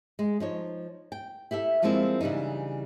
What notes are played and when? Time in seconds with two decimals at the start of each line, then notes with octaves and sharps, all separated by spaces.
0.19 G#3
0.40 F3 D#4 C#5
1.12 G5
1.51 E4 G4 A4 E5
1.82 F3 G3 G#3 A#3 C4 E4
2.21 C#3 E3 G3 D4 D#4